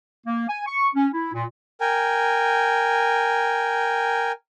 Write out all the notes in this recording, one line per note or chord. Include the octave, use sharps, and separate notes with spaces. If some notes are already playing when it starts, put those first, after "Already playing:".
A#3
G#5
C#6
C#4
E4
A#2
A#4 G5 G#5